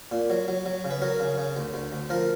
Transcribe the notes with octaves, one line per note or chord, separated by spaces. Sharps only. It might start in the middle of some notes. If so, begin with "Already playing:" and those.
A#2
F#3
F#3
F#3
C#3
B4
F#3 A#4
C#3
C#3
D2
D2
D2
F3 A#4